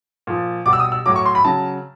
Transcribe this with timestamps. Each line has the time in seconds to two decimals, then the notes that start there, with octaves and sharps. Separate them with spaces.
0.27 A#2 F3
0.66 B2 G3 D6
0.73 E6
0.80 D#6
0.92 E6
1.06 A2 F#3 D6
1.16 C#6
1.26 C6
1.35 B5
1.45 C#3 F#3 A5